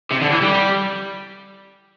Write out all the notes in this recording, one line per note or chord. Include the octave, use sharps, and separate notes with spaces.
C3
D3
E3
G3